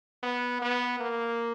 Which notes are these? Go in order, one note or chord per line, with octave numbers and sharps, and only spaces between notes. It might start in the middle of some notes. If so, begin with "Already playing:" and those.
B3
B3
A#3